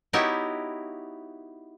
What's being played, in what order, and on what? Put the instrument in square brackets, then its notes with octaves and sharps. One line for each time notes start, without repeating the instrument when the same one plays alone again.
[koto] B3 D#4 E4 F#4 G4 C#5